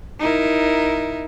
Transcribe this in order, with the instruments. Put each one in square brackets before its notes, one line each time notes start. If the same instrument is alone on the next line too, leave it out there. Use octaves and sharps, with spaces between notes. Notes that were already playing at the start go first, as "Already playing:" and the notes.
[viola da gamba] D#4 E4 A#4